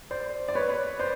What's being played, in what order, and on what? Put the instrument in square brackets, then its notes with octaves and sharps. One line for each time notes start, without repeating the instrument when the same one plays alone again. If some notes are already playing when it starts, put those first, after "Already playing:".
[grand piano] C5 D5
D5
B4 C#5
C5 D5